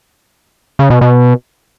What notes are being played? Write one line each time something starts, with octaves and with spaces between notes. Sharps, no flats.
C#3
B2
B2